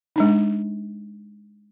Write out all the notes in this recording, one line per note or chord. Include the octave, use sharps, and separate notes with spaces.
G#3 D4 D#4